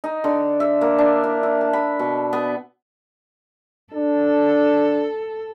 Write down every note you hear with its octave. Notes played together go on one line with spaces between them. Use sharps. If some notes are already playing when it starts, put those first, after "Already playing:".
D#4
D3
E5
A#3
D4
E4
E4
A5
B5
B2
B3
D4 A4